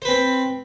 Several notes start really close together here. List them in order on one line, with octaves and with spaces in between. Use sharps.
C5 B4 C4